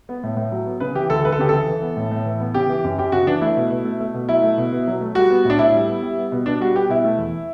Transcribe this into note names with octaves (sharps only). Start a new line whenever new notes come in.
B3
A2
A2
F#3
B3
C#3 B4
E3 G4
D2 A4
D2 B4
A4
C#3 G4
E3 A4
E3
B3
A2
A2
E3
B3
C#3 G4
E3
F#2
F#2 G4
C#3 F#4
E3 D4
A3 E4
B2
B2
A3
A3
B2
F#3 E4
A3
B2
B2
F#3
A3
G3 F#4
B3
A2 D4
A2 E4
G3
B3
G3
B3
B2
B2 D4
G3 F#4
B3 G4
B2 E4
A3
E2